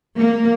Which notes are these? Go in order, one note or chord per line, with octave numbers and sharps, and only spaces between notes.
A#3